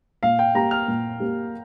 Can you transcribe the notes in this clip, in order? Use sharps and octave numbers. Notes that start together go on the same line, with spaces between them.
A#2 F5
G5
A#3 G4 A#5
F6
A#2
A#3 G4